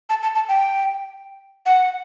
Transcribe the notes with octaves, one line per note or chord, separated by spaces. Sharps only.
A5
A5
A5
G5
F#5